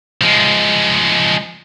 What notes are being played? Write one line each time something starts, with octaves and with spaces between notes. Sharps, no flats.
F3 G#3